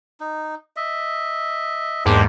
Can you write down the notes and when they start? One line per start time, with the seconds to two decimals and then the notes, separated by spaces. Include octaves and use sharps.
0.20 D#4
0.76 D#5 E5
2.05 E2 G#2 A#3 D4 G4 C5